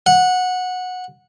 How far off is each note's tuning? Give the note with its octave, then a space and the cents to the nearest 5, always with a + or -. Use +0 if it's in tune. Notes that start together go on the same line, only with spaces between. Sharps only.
F#5 -15